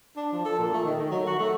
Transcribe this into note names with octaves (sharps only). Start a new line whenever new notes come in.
D4
F3
A4
A#2
A3
D#3
D#3
F#3
F#4
A3